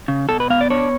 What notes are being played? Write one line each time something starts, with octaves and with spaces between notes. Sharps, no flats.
C#3
B2 A4
B4
B3 F5
D5
D4 C#5